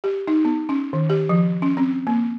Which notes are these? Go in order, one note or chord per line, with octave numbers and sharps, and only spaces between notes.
G4
D#4
B3
C#4
D#3
G4
F3
C#4
C4
A#3